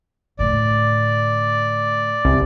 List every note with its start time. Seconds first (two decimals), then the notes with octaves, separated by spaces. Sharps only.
0.39 A2 D3 D5
2.25 C2